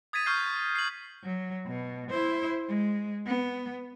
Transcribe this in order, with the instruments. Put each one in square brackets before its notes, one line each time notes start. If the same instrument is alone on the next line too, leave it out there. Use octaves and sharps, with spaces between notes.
[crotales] D#6 G#6 A6 B6 D#7
C#6 F6 G6 C7
C7 F#7
[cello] F#3
B2
E4 C5
G#3
B3